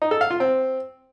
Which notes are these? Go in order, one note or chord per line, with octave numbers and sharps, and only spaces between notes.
D#4
A4
F5
F4
C4